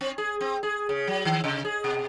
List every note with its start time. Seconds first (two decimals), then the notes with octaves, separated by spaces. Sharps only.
0.01 C4
0.18 G#4
0.41 C4
0.63 G#4
0.89 C#3
1.07 F#3
1.25 D#3
1.44 C3
1.65 G#4
1.84 B2